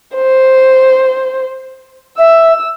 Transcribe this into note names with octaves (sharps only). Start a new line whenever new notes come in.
C5
E5 E6